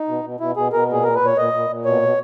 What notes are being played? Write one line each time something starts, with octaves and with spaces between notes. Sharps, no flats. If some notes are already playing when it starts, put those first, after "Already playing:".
Already playing: D#4
B2
B2
B2 E4
B2 G#4
B2 A#4
A#2 G#4
A#2 A#4
B4
A#2 C#5
A#2 D#5
A#2
A#2
B2 C#5
B2